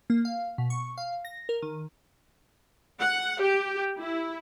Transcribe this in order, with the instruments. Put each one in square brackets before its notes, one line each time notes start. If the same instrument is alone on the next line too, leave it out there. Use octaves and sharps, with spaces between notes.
[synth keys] A#3
F5
B2
C#6
F5
A#6
A#4
D#3
[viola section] F#5
G4
E4